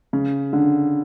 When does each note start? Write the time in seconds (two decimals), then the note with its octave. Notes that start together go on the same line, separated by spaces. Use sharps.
0.13 C#3
0.53 D3